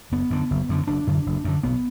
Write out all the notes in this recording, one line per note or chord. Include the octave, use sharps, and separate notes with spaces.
F#1 B3
F#2 D3
F#1
F#2 D3
F#1 D4
F#2 D3
F#1
F#2 D3
B1 B3